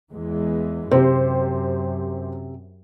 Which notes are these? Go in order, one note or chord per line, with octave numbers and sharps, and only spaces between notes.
E2 E3 G#3
F#2 C3 G4 C5